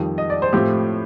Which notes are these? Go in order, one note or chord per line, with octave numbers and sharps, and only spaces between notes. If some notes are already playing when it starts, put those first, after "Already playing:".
Already playing: F2 D#3 G3
D#5
D5
C5
A2 F3 A3 C4 G4